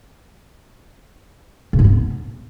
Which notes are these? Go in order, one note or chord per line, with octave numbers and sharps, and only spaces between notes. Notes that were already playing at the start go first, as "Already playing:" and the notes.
C#3
G#2
B3